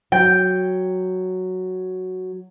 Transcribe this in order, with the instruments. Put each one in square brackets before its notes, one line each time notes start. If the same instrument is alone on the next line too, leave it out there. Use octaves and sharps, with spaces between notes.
[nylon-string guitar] F#3 [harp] G5